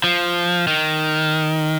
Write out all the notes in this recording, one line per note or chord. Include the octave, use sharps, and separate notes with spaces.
F3
D#3